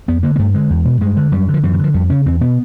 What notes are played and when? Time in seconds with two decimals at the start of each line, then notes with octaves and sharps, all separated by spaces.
0.08 F2 B3
0.23 D3 A#3
0.36 A#3
0.39 G2 A3
0.54 D3 G#3
0.70 E2
0.85 B2
1.01 G2 G#3
1.17 D3
1.32 F#2 G3
1.49 D3
1.54 F3
1.63 F#2 E3
1.73 D#3
1.79 D3
1.84 F3
1.94 F2 G3
2.10 C#3 C#4
2.26 E2 C4
2.41 B2 B3